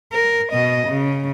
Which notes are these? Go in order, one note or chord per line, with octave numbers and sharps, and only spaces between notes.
A#4
B2 D#5
C#3